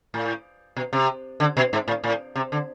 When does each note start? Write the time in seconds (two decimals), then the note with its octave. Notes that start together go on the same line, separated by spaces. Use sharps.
0.14 A2
0.76 B2
0.93 C3
1.40 D3
1.57 B2
1.73 G#2
1.88 A2
2.04 A2
2.36 C3
2.52 D3